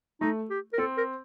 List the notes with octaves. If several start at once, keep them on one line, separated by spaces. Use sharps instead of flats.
A3 D#4
G4
A#4
C4 A4
A#4